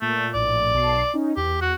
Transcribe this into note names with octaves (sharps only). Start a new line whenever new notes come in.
A#2 A3
A#1 A2 D5
B1 A5 C7
C#4 D#4
E2 G4
F#4